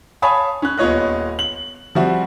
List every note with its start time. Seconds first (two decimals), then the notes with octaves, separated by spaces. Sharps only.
0.22 C#5 F5 G#5 A5 B5 D#6
0.62 C#4 F#6
0.78 D#1 B3 F4 C#5 D#5 F#6
1.39 F#7
1.95 F3 G3 C4 F#4 E5